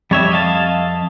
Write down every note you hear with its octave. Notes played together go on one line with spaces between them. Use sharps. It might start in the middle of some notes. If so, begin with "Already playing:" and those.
F2 G3 C#5 E5
D#5 F5 A5